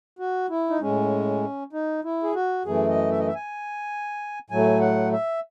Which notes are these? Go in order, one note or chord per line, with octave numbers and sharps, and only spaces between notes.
F#4
E4
D#4
A2 G#3 C#4
D#4
E4
G#4
F#4
F#2 E3 A3 G#4
D#5
E5
D#5
E5
G#5
A2 F#3 A3 G#5
F#5
E5